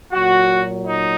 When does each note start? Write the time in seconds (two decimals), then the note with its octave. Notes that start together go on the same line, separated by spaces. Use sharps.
0.11 A#2 F#3 F#4
0.85 D#4